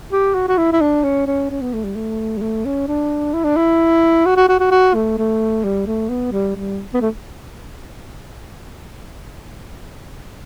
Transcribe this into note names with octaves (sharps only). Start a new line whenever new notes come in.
G4
F#4
F#4
E4
E4
D4
C#4
C#4
C#4
B3
A3
G3
A3
G3
A3
C#4
D4
E4
D4
E4
F#4
F#4
F#4
F#4
F#4
A3
A3
G3
A3
B3
G3
G3
B3
A3